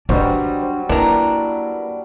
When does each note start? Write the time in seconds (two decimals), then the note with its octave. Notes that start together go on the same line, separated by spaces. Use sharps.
0.09 F#3 G3 D4 B4 C5 D#5
0.63 C5
0.89 A#3 D4 E4 A#4 B4 A#5